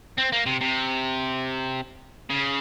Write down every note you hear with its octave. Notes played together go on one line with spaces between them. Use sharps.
C4
A#3
C3
C3
C#3